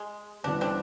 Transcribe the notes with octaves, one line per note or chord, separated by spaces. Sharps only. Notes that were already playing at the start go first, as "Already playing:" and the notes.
Already playing: G#3
E2 C#3 E3 G3 B3 D4
C4 D4